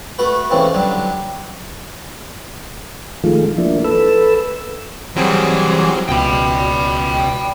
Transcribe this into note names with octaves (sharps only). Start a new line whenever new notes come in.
A3 F#4 B4
A2 C#3 E3 C4
D3 F#3 G3
D#3 F3 G#3 A3 F4
F3 A#3 D4 E4
A4 B4 E6
E3 F#3 G3 C4 G#4
C#2 B2 G5 B5